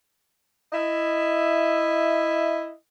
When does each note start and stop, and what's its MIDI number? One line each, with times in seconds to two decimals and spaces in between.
0.72 2.69 64
0.72 2.69 75
0.72 2.69 76